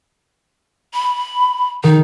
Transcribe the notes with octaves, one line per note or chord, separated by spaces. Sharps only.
B5
D#3 D#4